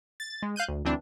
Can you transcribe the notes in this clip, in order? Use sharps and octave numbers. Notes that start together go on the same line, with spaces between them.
A6
G#3
F5 F#6 G6 D#7
D2
D2 E3 C4 D4